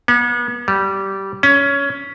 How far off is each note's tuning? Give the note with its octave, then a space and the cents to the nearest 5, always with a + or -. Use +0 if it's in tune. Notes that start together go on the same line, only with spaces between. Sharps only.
B3 -40
G3 -15
C#4 +15